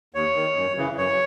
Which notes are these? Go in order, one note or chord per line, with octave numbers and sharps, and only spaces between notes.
D#2 C#5
D#3
F#2
C#3 E3
F#2 C#5